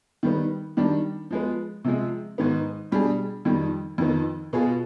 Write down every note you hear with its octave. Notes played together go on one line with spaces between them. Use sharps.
D#3 G3 B3
D#3 G3 D4
F3 G#3 B3
C3 F3 G#3
G#2 D#3 B3
B2 G3 D4 G#4
F2 D#3 G3
F2 D#3 B3
B2 B3 F4 G#4